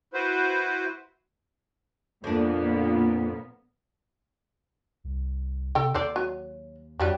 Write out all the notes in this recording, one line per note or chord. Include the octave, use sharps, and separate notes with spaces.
E4 F#4 B4 C5
F2 A#2 A#3 B3 D4
C2
C3 A4 G5
D#2 A4 C5 D5
F#3
F2 F#3 G3 D4